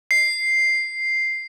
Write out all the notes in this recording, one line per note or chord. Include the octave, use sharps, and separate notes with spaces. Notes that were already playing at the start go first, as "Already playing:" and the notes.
C7